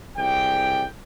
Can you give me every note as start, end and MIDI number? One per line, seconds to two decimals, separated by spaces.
0.17 0.84 36
0.17 0.84 68
0.17 0.84 74
0.17 0.84 79